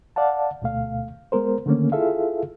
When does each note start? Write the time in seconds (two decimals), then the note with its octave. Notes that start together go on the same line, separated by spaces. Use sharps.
0.16 D5 F5 F#5 A5
0.62 D2 B2 A3 F5
1.32 G#3 B3 A#4 C5
1.66 D3 D#3 A3 A#3 C#4
1.92 E4 F4 G#4 A4 E5 F5